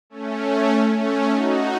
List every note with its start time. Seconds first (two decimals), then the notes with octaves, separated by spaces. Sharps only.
0.10 A3 C#4
0.99 A3 C#4
1.29 D#4 F#4